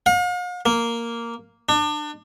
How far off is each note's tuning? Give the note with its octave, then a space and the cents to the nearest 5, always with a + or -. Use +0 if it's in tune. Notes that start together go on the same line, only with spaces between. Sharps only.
F5 +45
A#3 -5
D4 +30